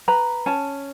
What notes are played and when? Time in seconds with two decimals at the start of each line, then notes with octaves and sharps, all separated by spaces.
0.08 B4 A#5
0.46 C#4 A5